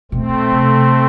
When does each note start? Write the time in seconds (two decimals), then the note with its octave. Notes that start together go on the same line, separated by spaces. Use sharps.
0.12 B2 A3 C4
0.52 C3